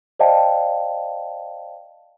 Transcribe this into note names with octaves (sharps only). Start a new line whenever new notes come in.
C5 D5 D#5 F5 G5 A5